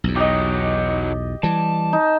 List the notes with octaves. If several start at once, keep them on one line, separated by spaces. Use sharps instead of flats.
B1 E2
F#3 D#4 G4 D#5
E3 G3 A5
D#4